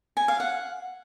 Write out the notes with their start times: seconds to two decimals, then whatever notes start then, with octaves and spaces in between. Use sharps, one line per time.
0.17 G#5
0.28 F5
0.40 F#5